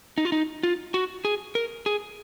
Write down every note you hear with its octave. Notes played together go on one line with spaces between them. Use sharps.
D#4
F4
D#4
F4
F#4
G#4
A#4
G#4